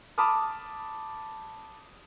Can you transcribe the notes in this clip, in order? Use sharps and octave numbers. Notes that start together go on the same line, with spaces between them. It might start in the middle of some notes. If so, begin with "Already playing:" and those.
A5 B5 D6 D#6 F6